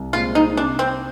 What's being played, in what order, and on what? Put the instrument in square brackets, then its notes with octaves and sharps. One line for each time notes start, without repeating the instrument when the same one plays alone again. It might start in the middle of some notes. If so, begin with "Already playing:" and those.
Already playing: [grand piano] C2
[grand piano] A#2 G#3 C4 [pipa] F4
[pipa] D#4
[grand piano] C3 [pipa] D4
[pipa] C4